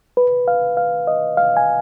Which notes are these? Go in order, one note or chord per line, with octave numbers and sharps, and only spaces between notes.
B4
F5
F5
D#5
F5
G#5